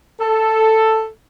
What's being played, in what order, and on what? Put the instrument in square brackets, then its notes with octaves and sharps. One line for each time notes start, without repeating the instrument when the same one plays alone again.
[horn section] A4